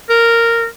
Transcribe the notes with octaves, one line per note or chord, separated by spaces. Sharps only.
A#4